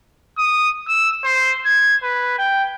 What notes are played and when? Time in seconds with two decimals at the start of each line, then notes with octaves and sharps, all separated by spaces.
0.38 D#6
0.88 E6
1.24 C5
1.66 G#6
2.03 B4
2.39 G5